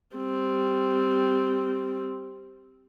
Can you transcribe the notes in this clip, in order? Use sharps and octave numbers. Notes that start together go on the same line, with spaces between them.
G3 C4